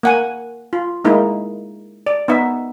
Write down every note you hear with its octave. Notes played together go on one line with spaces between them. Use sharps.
A#3 F#5 G#5
F4
G#3 A#3 D#4 E4
D5
B3 D#4 E5